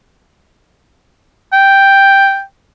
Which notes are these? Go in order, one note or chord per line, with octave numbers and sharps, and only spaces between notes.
G5